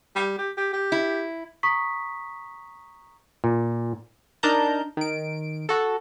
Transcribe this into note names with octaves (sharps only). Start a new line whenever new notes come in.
G3
G4
G4
G4
E4
A#5 C#6 D#6 B6
A#2
D4 D#4 A#4 A5 A#5 G6
D#3 D7
F#4 A4